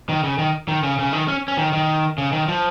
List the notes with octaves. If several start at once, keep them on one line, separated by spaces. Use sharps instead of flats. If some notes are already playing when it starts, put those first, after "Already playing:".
D#3
C#3
D#3
D#3
C#3
C#3
D#3
C#4
C#4
D#3
D#3
C#3
D#3
F3